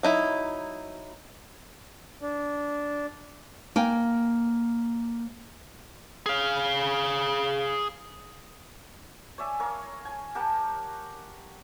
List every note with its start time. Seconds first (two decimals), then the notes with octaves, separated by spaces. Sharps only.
0.03 F#3 D#4 E4
2.21 D4
3.76 A#3 G5 G#5
6.26 G#4 F5
9.38 C#5 D5 E5 G#5
9.60 A#4 C#5 F5
10.05 G#5
10.35 G4 A#4 F#5 A5